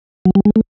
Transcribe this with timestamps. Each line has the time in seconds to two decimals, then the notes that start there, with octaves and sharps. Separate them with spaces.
0.25 F#3
0.35 G3
0.45 G#3
0.56 A3